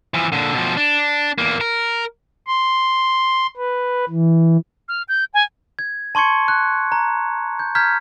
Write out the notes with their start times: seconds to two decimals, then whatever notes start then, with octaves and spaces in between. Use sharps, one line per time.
0.14 E3 F3
0.32 A#2 D3
0.54 B2 F3
0.77 D4
1.38 E2 A#3
1.61 A#4
2.47 C6
3.57 B4
4.09 E3
4.88 F6
5.09 G6
5.34 G#5
5.79 G#6
6.15 A5 C6 C#6 G#6 C#7
6.48 F#6
6.92 A#5
7.59 G6
7.75 A#5 F6 G6 G#6 B6